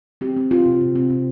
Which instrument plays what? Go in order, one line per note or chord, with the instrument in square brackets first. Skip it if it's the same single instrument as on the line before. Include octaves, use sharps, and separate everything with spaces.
[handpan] C4 G4
C4
C4 F4
C3
C3
C4
C3